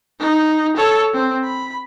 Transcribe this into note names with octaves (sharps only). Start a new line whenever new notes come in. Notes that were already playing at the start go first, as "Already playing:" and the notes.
D#4
A4 C#5
C4
B5